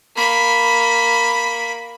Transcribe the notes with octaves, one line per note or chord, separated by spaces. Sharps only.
A#3 B5